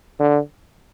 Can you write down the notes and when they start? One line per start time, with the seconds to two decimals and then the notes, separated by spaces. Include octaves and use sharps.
0.19 D3